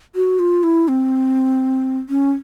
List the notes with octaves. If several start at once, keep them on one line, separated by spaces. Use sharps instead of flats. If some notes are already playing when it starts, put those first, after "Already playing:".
F#4
F4
E4
C4
C#4